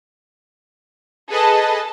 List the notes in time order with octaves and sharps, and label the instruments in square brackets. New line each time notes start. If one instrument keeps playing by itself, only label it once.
[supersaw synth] G#4 B4 D#5 [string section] A4 A5